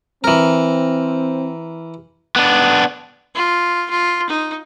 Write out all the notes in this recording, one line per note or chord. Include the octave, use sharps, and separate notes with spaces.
E3 C4 A#4
B3 D4
F4
F4
D#4